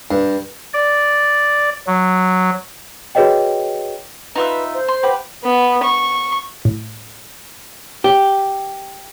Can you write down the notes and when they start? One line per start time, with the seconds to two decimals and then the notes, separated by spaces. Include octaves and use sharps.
0.11 G2
0.74 D5
1.87 F#3
3.15 F#4 G#4 B4 C#5 D#5 G5
4.35 D#4 F4 B4 E5
4.74 C5
4.88 C6
5.03 G4 B4 F#5
5.44 B3
5.83 C#6
6.65 A2
8.04 G4